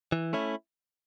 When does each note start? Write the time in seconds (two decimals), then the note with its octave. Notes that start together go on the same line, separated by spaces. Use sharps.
0.12 E3
0.33 A3 C#4 E4